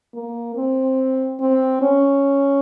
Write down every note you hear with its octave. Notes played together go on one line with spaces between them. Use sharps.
A#3
C4
C4
C#4